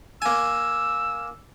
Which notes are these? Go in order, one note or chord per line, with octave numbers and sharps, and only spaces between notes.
A#3 G#5 E6